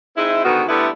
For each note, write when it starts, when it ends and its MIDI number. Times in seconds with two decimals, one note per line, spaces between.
0.17 0.42 56
0.17 0.42 60
0.17 0.42 63
0.17 0.42 64
0.45 0.63 44
0.45 0.63 47
0.45 0.63 50
0.45 0.63 51
0.45 0.63 59
0.45 0.63 66
0.68 0.88 50
0.68 0.88 55
0.68 0.88 57
0.68 0.88 59
0.68 0.88 64